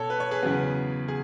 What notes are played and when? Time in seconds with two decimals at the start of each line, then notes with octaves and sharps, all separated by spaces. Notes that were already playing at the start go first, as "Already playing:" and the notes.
Already playing: B2 A4 C#5
0.10 B4
0.20 C#5
0.31 G#4 B4
0.43 E2 C#3 F#3 B3
1.08 G#4